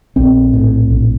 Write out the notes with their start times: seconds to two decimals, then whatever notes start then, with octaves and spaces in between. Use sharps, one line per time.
0.16 A#1 C4
0.53 A2
0.91 A#1